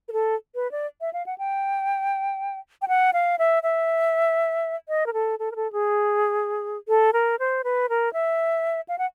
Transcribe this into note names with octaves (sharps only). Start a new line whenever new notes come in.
A#4
A4
B4
D5
E5
F5
F#5
G5
G5
F#5
F5
E5
E5
D#5
A#4
A4
A4
A#4
A4
G#4
A4
A#4
C5
B4
A#4
E5
F5
F#5